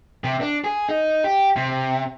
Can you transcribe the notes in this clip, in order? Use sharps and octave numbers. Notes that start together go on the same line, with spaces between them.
C3
D4
G#4
D#4
G4
C3